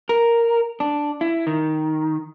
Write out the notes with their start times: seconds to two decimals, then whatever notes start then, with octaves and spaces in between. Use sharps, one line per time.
0.09 A#4
0.80 D4
1.21 E4
1.47 D#3